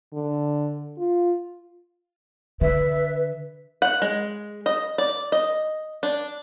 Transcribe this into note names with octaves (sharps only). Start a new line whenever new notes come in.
D3
F4
D3 B4 E5
F#5
G#3
D#5
D5
D#5
D4